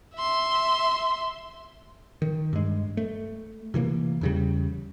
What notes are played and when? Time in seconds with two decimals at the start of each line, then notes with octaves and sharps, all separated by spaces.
0.16 E5 C6
2.22 D#3
2.53 G2 G#3
2.97 A3
3.74 C3 E3 F#3 A#3
4.21 E2 C#3 G3